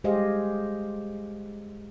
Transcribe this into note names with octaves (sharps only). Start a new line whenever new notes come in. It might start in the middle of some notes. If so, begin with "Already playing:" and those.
G#3 G4 G#4 C5 D#5 F5